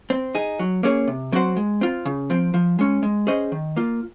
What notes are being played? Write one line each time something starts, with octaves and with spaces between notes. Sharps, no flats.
C4
D#4 G#4
F#3
A#3 C#4 G#4 C#5
C3
F#3 C4 F#4 C5
G#3
C4 F4
C#3
F3 C4
F3
G#3 C#4
G#3
C#4 G#4 C5 D#5
D#3
A#3 F4